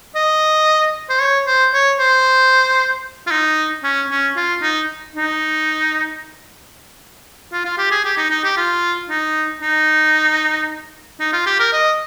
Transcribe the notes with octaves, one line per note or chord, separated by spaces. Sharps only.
D#5
C5
C#5
C5
C#5
C5
F4
D#4
C#4
C#4
F4
D#4
D#4
F4
F4
G4
G#4
G4
D#4
D#4
G4
F4
D#4
D#4
D#4
F4
G4
A#4
D#5